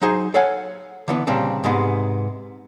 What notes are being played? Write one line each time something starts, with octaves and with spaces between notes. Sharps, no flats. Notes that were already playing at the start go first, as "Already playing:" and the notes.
F#3 D#4 G#4 C5
A4 C#5 F5 F#5 G#5
D3 E3 B3
A#2 C#3 G3 C4 D4
G#2 C3 G#3 B3